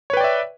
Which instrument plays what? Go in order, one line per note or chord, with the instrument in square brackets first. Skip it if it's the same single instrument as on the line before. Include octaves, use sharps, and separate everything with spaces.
[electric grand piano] C#5
B4
G5
D5
E5